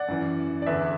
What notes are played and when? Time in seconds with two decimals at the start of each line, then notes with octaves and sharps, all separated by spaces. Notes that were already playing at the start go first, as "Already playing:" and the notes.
Already playing: D5 F#5
0.08 F#2 E3
0.62 D5
0.66 E2 D3 B4 E5